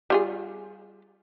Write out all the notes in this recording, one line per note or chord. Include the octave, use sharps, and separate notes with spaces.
G3 F4 G#4